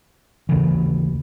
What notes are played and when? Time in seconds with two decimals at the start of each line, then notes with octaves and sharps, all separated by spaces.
0.49 D#2 C#3 E3